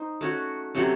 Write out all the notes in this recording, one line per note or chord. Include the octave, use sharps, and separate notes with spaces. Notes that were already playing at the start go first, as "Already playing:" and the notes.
Already playing: D#4 C5
A3 C#4 F#4
C3 F#3 A3 C#4